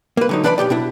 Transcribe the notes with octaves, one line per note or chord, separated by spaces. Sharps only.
A#3 B4
D3 F#3 D#4
E3 D4 B4 D5 G5 B5
B1 F3 G4 D5
B2 D4 E4